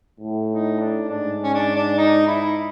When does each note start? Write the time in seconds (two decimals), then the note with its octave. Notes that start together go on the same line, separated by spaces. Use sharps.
0.20 A2
0.50 D#4
0.79 D4
1.08 G#2 D4
1.44 C#4
1.54 D4
1.76 D4
1.98 D#4
2.27 E4